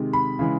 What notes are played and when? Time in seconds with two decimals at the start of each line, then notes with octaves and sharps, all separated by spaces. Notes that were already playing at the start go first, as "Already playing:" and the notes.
Already playing: C3 D#3 G#3
0.13 B5
0.39 C#3 E3 G#3